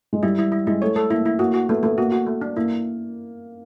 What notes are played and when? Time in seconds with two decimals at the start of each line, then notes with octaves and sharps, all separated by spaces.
0.13 G#3
0.23 G3 E4
0.38 E4
0.52 E4
0.67 G#3 E4
0.82 A3 C#5
0.96 A4
1.10 A#3 E4
1.25 E4
1.39 A#3 F#4
1.54 F#4
1.69 A3 B3
1.83 A3 B3
1.98 A#3 F#4
2.12 F#4
2.26 A3
2.41 D4
2.57 A#3 E4